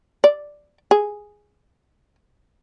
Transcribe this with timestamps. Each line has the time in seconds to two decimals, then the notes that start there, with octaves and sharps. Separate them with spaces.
0.24 D5
0.91 G#4